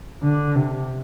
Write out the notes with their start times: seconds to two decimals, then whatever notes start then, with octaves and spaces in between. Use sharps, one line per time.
0.23 D3
0.56 C3